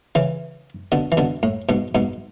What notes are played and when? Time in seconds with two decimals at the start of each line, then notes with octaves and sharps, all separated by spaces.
0.15 C#3 E3
0.92 B2 D3
1.12 E3
1.17 B2 D3
1.43 A2
1.69 G#2 B2
1.95 G#2 B2